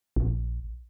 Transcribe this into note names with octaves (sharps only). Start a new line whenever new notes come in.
A#1